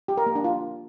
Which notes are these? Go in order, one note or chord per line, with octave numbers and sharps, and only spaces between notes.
G4
A#4
A#3
D4
F4